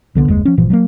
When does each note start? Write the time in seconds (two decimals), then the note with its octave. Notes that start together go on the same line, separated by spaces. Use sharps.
0.15 C2 D3 G3 B3
0.28 F#1 D#2 G#3
0.45 F3 C#4
0.57 G1 A#2 E3 F3
0.70 F#3 G3 A#3